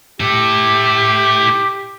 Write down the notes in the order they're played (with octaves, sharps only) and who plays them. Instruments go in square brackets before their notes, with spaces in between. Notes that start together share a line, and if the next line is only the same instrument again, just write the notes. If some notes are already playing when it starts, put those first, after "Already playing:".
[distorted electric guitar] E4 A4 [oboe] G4